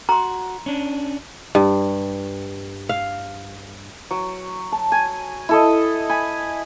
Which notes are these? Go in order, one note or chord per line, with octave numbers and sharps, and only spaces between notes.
F#4 A#5 C6
C#4 D4
G2
F5
F#3
A5
G#5
E4 A4 D#5
G#5 B5